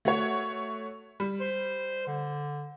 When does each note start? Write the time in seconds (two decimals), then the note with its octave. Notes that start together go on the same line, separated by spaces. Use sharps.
0.05 A3 F#4 C#5
1.20 G3
1.40 C5
2.07 D3